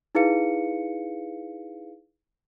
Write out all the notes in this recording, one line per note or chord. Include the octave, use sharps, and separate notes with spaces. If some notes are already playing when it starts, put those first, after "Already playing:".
D#4 E4 G#4 B4 F5 C#7